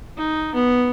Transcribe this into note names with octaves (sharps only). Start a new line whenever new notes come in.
D#4
B3